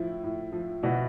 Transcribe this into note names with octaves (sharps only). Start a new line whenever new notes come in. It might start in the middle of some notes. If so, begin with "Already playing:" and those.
Already playing: A2 F3 E4
A2
F3
B2 E4 F#4